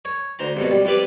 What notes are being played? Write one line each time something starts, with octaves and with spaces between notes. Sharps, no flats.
C#5
D2 C5 A#5
C2 F2 B2
G3
F2 G3 B4 D5